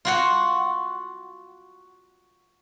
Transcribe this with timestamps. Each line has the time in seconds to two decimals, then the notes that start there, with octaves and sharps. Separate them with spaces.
0.05 F4 F#4 F#5